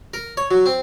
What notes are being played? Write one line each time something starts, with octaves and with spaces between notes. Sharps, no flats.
A#4
C#5
F#3
C4